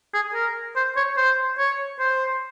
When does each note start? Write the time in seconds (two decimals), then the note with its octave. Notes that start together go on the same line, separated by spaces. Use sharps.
0.14 G#4
0.34 A#4
0.76 C5
0.96 C#5
1.17 C5
1.59 C#5
2.00 C5